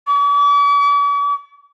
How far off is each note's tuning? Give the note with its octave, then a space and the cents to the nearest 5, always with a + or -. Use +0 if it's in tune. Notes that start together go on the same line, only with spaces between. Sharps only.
D6 -45